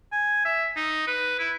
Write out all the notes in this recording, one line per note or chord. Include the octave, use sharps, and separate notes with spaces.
G#5
E5
D#4
B4
E4